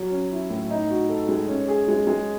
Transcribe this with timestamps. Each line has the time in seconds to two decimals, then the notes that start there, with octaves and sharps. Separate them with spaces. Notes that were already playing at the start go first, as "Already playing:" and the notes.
Already playing: F#3
0.11 C#4
0.31 E4
0.50 A2
0.70 D#4
0.90 F#4
1.09 A4
1.29 G#3
1.49 C#4
1.68 G#4
1.88 G#3
2.07 G#3